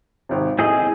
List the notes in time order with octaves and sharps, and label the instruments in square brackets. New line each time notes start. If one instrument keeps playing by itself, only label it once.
[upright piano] G#1 C3
[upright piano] A2 [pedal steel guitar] C4 G#4 D#5